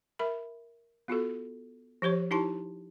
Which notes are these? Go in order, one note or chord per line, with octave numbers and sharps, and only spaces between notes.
A#4 E5 B5
B3 F4 F#4 A4
F3 G4 C5 C#5
D#4 E4 G4 A5 C6